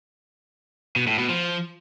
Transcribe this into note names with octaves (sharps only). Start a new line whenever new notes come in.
B2
A2
B2
F3